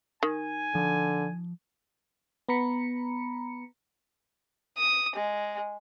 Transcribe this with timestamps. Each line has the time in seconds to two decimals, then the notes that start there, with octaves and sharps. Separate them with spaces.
0.23 D#3 G#5
0.75 D3 F3
2.49 B3 A#5 B5 C#7
4.78 D#6
5.16 G#3